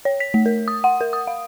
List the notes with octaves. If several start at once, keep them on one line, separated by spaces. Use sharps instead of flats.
C#5
B6
A3
A#4
D#6
F#5
A#4
D#6
F5